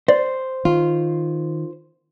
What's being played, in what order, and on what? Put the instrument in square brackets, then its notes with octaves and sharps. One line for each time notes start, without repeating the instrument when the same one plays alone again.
[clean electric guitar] C5 [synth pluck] D5
[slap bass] D#3 [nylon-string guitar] F4